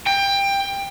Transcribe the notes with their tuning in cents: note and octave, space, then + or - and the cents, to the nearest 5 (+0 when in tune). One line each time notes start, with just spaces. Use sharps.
G5 +20